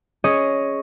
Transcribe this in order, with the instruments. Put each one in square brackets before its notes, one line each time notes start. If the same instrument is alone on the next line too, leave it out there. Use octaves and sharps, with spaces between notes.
[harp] C#4 G#4 C#5 D#5